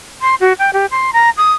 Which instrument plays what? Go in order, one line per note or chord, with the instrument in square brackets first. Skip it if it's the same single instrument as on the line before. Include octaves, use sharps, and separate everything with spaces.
[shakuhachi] C6
F#4
G5
G4
C6
A#5
D#6